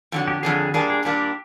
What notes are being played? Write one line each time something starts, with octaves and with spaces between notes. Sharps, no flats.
F2 D3 F#3
G4
F2 D3 F#3 G#4
A#2 G3 A#3 D4 G#4
G#4
A#2 G3 A#3 D4 G4